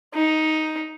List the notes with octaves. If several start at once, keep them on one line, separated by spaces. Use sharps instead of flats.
D#4